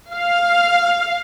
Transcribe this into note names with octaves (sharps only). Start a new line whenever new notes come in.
F5